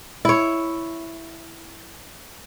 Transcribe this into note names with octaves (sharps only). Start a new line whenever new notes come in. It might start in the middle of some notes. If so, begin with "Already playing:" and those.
E4 C#5